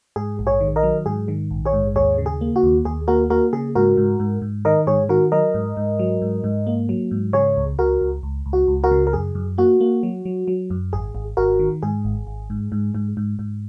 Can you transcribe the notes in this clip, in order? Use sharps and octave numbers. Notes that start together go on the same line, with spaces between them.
G#2 G#4
A#1
G#4 C#5
D#3
A#4 D#5
F#3
G#2 G#4
D#3
A#1
G#4 C#5
G#2
D#2 G#4 C#5
C#3
G#4
A#3
F#4
D#2
D#2 G#4
A#3 F#4 A#4
A#3 F#4 A#4
C#3 G#4
G#2 F#4 A#4
G#2
G#2
G#2
D#3 A#4 D#5
G#2 G#4 C#5
D#3 F#4 A#4
F#3 A#4 D#5
G#2
G#2
F#3
G#2
G#2
A#3
F#3
G#2
C#3 G#4 C#5
C#2
C#2 F#4 A#4
C#2
C#2
C#2
F#4
C#2
F#4 A#4
C#3
A#4
F#2 G#4
F#2
A#3 F#4
A#3
F#3
F#3
F#3
F#2
G#1 G#4
G#1
G#1 F#4 A#4
D#3
G#2 G#4
G#1
G#1
G#2
G#2
G#2
G#2
G#2